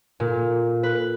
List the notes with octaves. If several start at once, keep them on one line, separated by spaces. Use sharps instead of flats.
A#2
B4